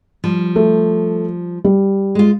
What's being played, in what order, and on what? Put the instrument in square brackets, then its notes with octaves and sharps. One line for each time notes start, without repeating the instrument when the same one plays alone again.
[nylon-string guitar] F3 G3
[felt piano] A3
G3
[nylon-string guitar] G#3 F4